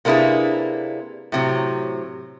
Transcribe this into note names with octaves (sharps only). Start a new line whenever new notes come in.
C3 A#3 D4 E4 G#4 B4
A2 C3 F#3